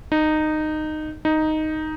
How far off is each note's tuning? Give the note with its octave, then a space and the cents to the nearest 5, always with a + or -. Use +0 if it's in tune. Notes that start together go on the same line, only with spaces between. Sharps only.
D#4 -15
D#4 +0